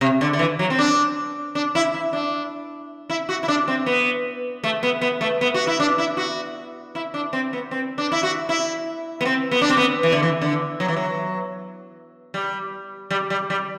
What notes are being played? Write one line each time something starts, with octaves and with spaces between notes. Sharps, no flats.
C3
D3
D3
E3
F#3
C4
D4
D4
E4
E4
D4
E4
F#4
E4
D4
C4
B3
A3
B3
B3
A3
B3
F#4
E4
D4
E4
F#4
E4
D4
C4
B3
C4
D4
E4
F#4
E4
B3
C4
B3
D4
C4
B3
E3
D3
E3
D3
F#3
E3
F#3
G3
G3
G3
G3